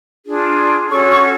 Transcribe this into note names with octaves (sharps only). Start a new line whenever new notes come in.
D4 F4 G#4
C#4 F#4 A4 C#5 C#6
C#6